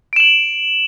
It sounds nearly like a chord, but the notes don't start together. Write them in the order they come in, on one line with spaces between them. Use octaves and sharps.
D7 E7 F#7